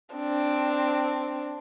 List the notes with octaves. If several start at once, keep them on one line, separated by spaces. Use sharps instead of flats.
C4 D4